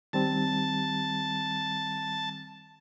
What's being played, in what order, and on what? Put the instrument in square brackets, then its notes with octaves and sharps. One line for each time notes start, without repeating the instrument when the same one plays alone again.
[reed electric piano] D#3 G3 C4 [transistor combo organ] A5